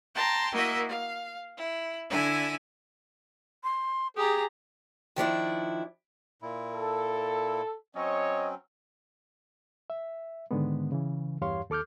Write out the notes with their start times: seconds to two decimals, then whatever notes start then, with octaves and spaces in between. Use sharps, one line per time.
0.15 G5 A5 A#5 C6
0.53 A#3 E4 F#4 D#5 E5
0.89 F5
1.57 E4
2.10 D3 E4 E5 G#5
3.64 C6
4.16 G4 G#4 A#5 D#6
5.16 D#3 F3 D4 E4
6.42 A#2 E4
6.75 A4
7.95 F#3 C4 C#4 C#5 D#5
9.90 E5
10.51 G#2 D3 D#3 G#3 B3
10.92 C#3 E3
11.41 E2 G2 G4 C#5 F5 C6
11.70 D#2 A4 D6 F6 G6